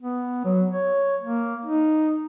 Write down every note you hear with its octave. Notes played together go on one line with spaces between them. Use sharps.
B3
F#3
C#5
A#3
D#4